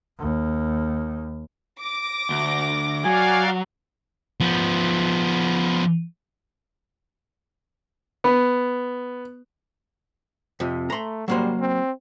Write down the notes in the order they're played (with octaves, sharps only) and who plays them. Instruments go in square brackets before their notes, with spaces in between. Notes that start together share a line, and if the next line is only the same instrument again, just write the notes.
[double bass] D#2
[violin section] D6 A#6
[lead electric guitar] D2
[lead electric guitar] F#3 [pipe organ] F#4 D5 F5 [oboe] G#5
[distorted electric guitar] F3 B3
[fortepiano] B3
[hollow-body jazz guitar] F2 C3
[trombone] A3 [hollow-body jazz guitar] A#5 C6
[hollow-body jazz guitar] F#3 A#3 C5 [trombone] G3
[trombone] C4